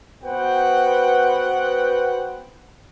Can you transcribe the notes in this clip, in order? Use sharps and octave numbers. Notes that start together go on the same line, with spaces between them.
B3 F#4 B4 C5 F#5 G5